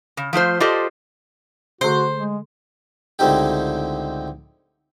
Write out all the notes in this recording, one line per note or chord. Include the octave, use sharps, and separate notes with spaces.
C#3
F3 A3 F4 C5
F4 G4 A4 C5 D5 D#5
D3 A3 F#4 G#4 C5
G#3
C#2 A2 D3 C4 D#4 G4